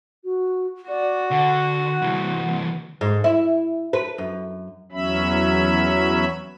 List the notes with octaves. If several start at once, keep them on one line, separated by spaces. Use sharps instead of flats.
F#4
F#4 D5
D3 F#5
C2 E3
G#2
E4
B4
F#2
E2 F#3 C#4 E5 B5